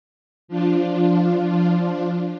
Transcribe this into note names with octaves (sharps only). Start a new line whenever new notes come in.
F3 D4 F4